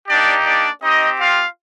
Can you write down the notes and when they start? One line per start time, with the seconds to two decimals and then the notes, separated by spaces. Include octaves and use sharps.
0.08 A#3 D4 D#4 G4 D5
0.46 D4 D5
0.82 C4 D#4 G4 D#5
1.19 F4 F5